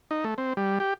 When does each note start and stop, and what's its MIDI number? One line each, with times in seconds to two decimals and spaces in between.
0.11 0.24 63
0.24 0.34 57
0.38 0.53 60
0.57 0.79 55
0.80 0.94 67